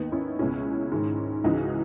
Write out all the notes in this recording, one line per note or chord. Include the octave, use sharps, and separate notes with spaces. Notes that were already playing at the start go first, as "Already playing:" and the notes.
Already playing: D#2 D#3 B3 D#4
C#4 E4
C#2 B2 C#4 E4
G#2 D#3
C#2 C#3 E3 D#4 F#4